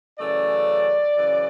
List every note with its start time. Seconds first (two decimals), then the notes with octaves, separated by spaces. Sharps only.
0.19 F#2 C#3 E3 A3 D5
1.17 F#2 C#3 E3